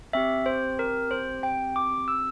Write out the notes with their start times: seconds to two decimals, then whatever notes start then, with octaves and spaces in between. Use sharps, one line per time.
0.13 C4 G4 E5
0.46 C5
0.79 A#4
1.11 C5
1.43 G5
1.76 D6
2.08 E6